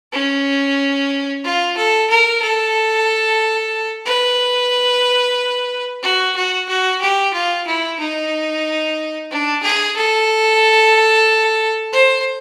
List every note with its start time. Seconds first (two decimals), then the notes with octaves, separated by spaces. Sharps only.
0.12 C#4
1.44 F4
1.76 A4
2.09 A#4
2.42 A4
4.05 B4
6.02 F#4
6.36 F#4
6.68 F#4
7.01 G4
7.33 F4
7.66 E4
7.99 D#4
9.30 D4
9.63 G#4
9.96 A4
11.92 C5